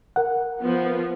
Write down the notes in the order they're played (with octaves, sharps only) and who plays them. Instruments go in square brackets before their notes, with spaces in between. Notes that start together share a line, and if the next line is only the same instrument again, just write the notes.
[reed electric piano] A#4 F#5
[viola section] F3 B3